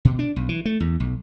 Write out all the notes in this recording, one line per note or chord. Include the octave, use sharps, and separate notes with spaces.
B2
D4
B1
E3
A3
E2
B1